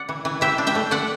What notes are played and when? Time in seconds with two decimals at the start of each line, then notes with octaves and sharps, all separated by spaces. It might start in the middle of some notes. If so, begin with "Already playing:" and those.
Already playing: D5 F#5
0.09 E3
0.25 E3
0.41 E3 E5 G5
0.58 D4
0.67 E5 G5
0.75 A3
0.91 A3 D5 F#5